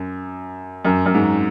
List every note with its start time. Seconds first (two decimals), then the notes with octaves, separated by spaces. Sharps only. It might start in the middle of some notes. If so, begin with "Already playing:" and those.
Already playing: F#2
0.85 F#2
1.06 F#2
1.14 G#2